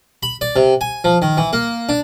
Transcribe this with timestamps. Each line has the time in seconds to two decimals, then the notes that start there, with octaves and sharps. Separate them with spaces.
0.23 B5
0.41 D5
0.56 C3
0.81 G#5
1.04 F3
1.22 D#3
1.37 E3
1.53 A#3
1.89 D4